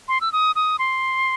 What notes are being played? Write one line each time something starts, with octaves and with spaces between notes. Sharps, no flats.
C6
E6
D#6
D#6
C6